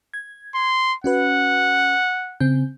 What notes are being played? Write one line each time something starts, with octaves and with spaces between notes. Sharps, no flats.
G#6
C6
C#4 F#4 B4 F#5
C#3 C4 G6